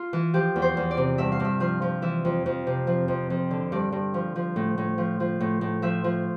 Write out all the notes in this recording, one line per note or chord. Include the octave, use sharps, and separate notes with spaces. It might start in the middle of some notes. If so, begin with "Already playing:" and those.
Already playing: F4
E3
F3 G4
E2
C5
E2
D5
C3
G2 E5
F5
G2 E5
F3 F5
F3
E3 E5
F2
F2
C3
F3
F2
F2
D3
G2 D5
G2
F3
F3
A2
A2
F3
F3
A2
A2
F3 E5
F3